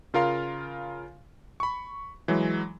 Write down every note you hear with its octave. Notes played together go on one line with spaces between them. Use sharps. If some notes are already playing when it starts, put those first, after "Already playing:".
C#3 F4 A#4 F5 C6
B5 C#6
E3 F#3 G#3